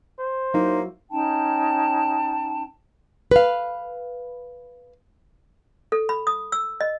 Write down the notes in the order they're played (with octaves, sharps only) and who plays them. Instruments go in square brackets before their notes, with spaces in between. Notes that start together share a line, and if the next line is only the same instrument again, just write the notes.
[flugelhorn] C5
[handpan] F#3 E4 [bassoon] A#3 [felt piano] D#4
[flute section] C#4 D#4 G5 A5
[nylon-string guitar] B4 F5
[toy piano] A4
B5
D#6
E6
D#5